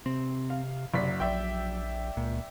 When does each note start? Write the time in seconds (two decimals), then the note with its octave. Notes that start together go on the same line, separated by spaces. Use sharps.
0.06 C3 C4
0.50 F5
0.94 F#1 C3 F#3 D5 B6
1.20 A#1 D5 E5 G5
2.17 C#2 A#2